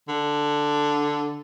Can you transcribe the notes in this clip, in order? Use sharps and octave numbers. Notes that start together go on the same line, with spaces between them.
D3